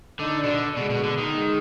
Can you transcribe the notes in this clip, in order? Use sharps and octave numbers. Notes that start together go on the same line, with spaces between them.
D3 D#4
B2 D4
D3
B2 G#3
B2
D3
D#3
G#3